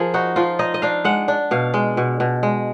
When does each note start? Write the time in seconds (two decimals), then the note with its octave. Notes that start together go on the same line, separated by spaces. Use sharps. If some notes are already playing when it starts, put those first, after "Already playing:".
Already playing: F3 G#4 A#4
0.14 D#4 F#4
0.36 F3 F4
0.59 D#4 D#5
0.74 D#5
0.82 D4 F5
1.05 G#3 F#5
1.28 D4
1.51 B2 F5
1.74 G#3
1.97 B2
2.20 B2
2.43 G#3